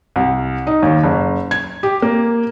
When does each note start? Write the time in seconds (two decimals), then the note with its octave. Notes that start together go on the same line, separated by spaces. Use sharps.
0.16 C2
0.67 D#4
0.82 D#2
1.04 F#1
1.51 G#6
1.83 G4
2.02 A#3